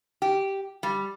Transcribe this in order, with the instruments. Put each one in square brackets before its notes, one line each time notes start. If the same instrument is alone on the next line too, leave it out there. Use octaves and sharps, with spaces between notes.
[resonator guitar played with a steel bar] G4
G3